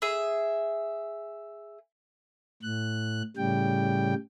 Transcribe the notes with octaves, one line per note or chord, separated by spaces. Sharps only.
G#4 E5
A2 F#6
A2 C#3 G3 G5